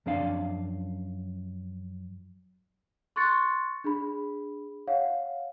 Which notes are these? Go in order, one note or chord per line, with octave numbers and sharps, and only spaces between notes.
F#2 F3 C4 D4 F5
C6 C#6 F#6 A6 C#7
D4 G#4 B5
C#5 F5 F#5